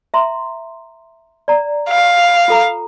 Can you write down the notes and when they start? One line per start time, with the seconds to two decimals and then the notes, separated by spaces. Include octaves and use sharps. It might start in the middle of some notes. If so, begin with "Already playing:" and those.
0.14 E5 A#5 C6
1.48 D5 A#5
1.89 F5
2.48 F4 A4 A#5